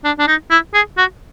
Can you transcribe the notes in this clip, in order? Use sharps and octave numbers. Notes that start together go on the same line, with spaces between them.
D4
D4
D#4
E4
G#4
F#4